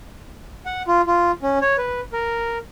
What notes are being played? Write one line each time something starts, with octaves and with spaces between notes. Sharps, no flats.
F#5
F4
F4
C#4
C#5
B4
A#4